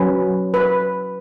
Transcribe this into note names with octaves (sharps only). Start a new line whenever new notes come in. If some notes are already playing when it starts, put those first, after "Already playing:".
Already playing: F#3 C#4 B4
B4